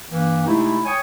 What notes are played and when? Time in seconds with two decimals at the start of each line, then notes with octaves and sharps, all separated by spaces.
0.11 G2 E3 A#3
0.46 C3 G#3 A3 D#4 E4
0.85 C#5 G5 G#5 C#6 D#6